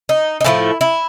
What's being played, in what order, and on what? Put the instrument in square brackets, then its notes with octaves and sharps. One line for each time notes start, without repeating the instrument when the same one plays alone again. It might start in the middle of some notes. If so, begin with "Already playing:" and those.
[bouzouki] D#4
D#4
A2 F3 A3 E4
E4